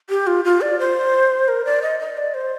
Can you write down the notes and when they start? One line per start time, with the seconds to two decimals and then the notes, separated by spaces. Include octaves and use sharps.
0.10 G4
0.27 F4
0.45 F4
0.61 D5
0.79 C5
1.48 A#4
1.65 D5
1.82 D#5
2.00 D#5
2.17 D5
2.34 C5